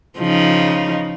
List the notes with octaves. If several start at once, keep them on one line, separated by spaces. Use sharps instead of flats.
C#3 F3 D#4